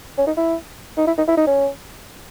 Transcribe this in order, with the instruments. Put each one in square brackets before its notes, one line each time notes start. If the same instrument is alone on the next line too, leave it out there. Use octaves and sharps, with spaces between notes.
[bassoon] C#4
D#4
E4
D#4
E4
D#4
E4
D#4
C#4